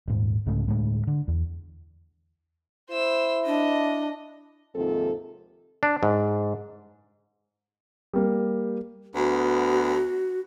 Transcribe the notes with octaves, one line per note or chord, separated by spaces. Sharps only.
D#1 G#2
C2 G#2 C#3 A3
D2 A2 G#3
D3
E2
E4 C5 E6
D4 D#5
D#2 G#2 C3 F3 C4 A4
D4
G#2
G3 A#3
D2 B3 F#4